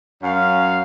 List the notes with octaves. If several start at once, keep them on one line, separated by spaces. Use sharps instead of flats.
F#2 C#4 F5